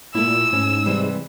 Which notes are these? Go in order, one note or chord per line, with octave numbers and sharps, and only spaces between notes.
A#2 A3 E4 E6
G#2 C#4
C3 E3 G3